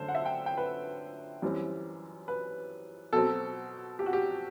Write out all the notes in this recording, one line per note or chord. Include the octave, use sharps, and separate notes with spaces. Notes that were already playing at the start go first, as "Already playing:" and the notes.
Already playing: F#2 D3 A3 C5
F#5
E5
G5
G5
B4
F#2 E3 G3 C4
B4
B2 F#3 C4 A4
G4
F#4
G4